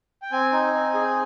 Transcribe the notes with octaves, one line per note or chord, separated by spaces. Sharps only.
G5
C4 G#5
D#4
C4
G#4